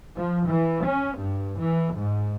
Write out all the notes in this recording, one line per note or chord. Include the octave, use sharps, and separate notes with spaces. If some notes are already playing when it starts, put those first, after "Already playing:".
F3
E3
C#4
G2
E3
G#2